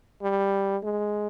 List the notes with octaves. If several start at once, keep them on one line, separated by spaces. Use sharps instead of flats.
G3
G#3